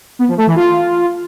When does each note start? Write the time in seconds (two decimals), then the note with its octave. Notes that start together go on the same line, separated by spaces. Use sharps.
0.19 B3
0.28 F3
0.37 A3
0.47 E3
0.56 F4